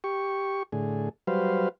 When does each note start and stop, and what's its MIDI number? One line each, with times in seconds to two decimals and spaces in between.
0.04 0.63 67
0.04 0.63 85
0.72 1.09 45
0.72 1.09 50
0.72 1.09 68
1.27 1.69 54
1.27 1.69 55
1.27 1.69 71
1.27 1.69 72
1.27 1.69 77